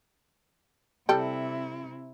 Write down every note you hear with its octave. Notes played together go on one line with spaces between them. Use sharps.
C3 G3 E4 A4 G5